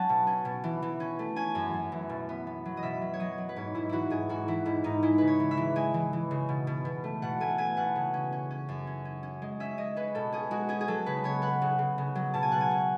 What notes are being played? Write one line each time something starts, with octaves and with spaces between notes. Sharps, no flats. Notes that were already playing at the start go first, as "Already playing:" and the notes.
Already playing: F#3 C#4 F#5 A5
B2
C#4
B2
E3
E3
C#4
A3
C#4 G#5
F#2
F#2
E3
B2
B3
B3
F#3
D#5
B2 E5
F#3
C#5
F#3 D#5
F#3
B4
G#2 C#5
G#2 E4
E3 E4 F#4
G#2 G#4
G#2 F#4
E3 E4
G#2 E4
G#2 D#4
G#3 E4
C#3 B4
C#5
E3
E5
E3
G#3 G#5
E3
E3
C#3
B2
B2
B2
A3
B2 F#5
A3 G#5
A3 G#5
B2 F#5
C#3
C#4
C#4
C#4
F#2
C#4
C#4
C#4
G#3
C#4 E5
G#3 D#5
C#4 B4
B2 A4
C#4 G#4
G#3 F#4
C#4 G#4
G#4
F#3 A4
C#3 B4
B3 C#5
B3 F#5
C#3
C#3
C#3
F#3
B2 A5
G#5
B2 F#5
G#5
C#4